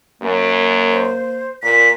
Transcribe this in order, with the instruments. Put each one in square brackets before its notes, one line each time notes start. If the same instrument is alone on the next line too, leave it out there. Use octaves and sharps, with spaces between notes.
[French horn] F#2 [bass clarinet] A#3
[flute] C5
[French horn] A#2 [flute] B6